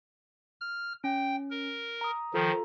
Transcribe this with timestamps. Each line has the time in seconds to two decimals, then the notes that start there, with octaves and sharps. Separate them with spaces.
0.61 F6
1.04 C#4 G5
1.50 A#4
2.01 A#5 D#6
2.34 D#3 F3 F4 A4 A#5